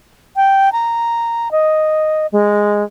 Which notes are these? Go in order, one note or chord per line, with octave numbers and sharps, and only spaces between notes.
G5
A#5
D#5
G#3